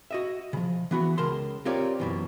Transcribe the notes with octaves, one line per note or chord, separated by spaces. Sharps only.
F#4 D#5 E5
C#3 F3
E3 B3 F#4
C#2 A#4 A5 C6
C4 F4 G4 A#4 C#5 D5
F#2 B2 E3